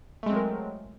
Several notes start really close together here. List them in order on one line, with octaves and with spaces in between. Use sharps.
A3 G#3 C4 F#3 A#4